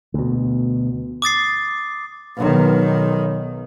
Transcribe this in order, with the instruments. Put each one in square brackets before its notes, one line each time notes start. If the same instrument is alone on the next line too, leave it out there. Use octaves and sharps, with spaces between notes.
[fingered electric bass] D2 B2
[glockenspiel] D6 D#6 A6 C7
[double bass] B1 D#3